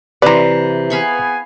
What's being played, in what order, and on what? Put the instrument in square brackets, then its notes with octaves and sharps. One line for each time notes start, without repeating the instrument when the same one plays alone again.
[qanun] C3 E3 [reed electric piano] B4 A#5 [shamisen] C5 D5
[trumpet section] B3 G#4 G#5 [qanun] F5 B5 C#6